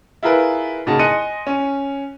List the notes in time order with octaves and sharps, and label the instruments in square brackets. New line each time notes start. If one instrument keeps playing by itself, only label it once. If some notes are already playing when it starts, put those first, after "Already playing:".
[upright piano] E4 F4 G#4 A#4 B4
A#2 C#3 D#4 F#4 A5
D#5 G#5 C6 F#6 C#7 D#7
C#4